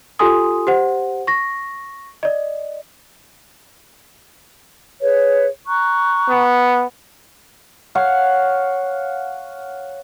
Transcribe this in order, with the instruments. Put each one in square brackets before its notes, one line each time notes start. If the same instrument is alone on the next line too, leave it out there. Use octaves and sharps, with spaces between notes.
[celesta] F4 G4 A4 G#5 C6 D#6
G4 C5 F#5
C#6 A#6
D5 D#5
[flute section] G#4 B4 C#5
A#5 C#6 F#6
[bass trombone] B3
[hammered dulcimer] C#5 F5 F#5